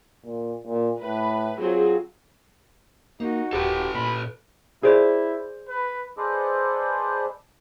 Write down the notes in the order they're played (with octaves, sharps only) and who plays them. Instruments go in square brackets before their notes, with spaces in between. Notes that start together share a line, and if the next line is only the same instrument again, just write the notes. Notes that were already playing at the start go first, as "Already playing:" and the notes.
[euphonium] A#2
A#2
[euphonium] A2 [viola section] B4
[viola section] F#3 C4 G#4 [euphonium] F4
[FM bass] A#3 [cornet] D#4 [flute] F#4
[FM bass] D#1 [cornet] G4 [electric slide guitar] A4 B4
[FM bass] A#2 [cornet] B5
[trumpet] E4 [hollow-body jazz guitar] G#4 C5 D5
[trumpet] B4
[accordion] G#4 A4 B4 C5 D5 D#5